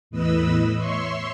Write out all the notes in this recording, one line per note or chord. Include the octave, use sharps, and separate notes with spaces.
E2 A2 B4 D#5 B5 E6
C#5 E5 C6 C#6